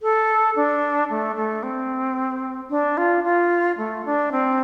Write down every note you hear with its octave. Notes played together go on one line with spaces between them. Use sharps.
A4
D4
A3
A3
C4
D4
F4
F4
A3
D4
C4